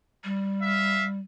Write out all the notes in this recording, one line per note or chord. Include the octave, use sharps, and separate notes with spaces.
G3
E5 F5